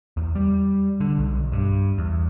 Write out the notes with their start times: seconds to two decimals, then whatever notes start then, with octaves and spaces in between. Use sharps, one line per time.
0.17 E2
0.35 G3
1.00 D3
1.18 B1
1.52 G2
1.98 E2